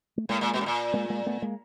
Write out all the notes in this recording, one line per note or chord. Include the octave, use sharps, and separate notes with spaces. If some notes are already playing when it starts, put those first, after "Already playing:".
A3
A2 G#3 A#3
A#2
B2
A2
A#2
G#3 A#3
G#3 A#3
A3 B3
G#3 A#3